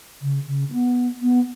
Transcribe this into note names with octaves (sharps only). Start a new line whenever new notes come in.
C#3
C#3
B3
B3